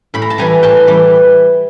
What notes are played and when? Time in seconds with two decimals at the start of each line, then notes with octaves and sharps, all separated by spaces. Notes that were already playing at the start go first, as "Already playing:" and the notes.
0.14 A2 B5
0.22 A#5
0.30 A5
0.38 E3 G3 G#5 A#5
0.63 A2 G5 A5
0.87 E3 G3